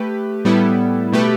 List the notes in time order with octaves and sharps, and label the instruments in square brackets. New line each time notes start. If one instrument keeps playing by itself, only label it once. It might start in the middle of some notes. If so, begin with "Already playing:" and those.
Already playing: [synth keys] A3 G4 B4
A2 G3 B3 E4 A4
B2 A3 G4 B4